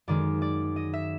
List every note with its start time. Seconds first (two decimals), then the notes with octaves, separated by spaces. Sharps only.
0.08 F#2 D#3 G#3 D5
0.42 D5
0.76 D#5
0.93 E5